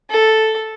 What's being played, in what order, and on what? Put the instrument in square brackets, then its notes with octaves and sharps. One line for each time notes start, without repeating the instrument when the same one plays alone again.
[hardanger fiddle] A4